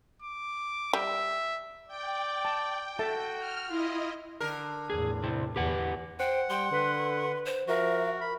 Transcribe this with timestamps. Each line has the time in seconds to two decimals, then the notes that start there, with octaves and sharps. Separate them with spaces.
0.22 D6
0.93 G3 E5
1.88 D5 G5
2.45 A5
2.99 F#4 A4 E5 A5
3.39 F6
3.69 E4 F4 D#5
4.40 D3 A#4
4.90 E2 A2 G#4
5.23 C3 E4
5.56 E2 G4 B4 F#5
6.19 C5 F#5 G5
6.50 G3 G5 C6
6.71 D3 B4
7.46 C5
7.68 F3 F#4 A#4 E5
8.21 B5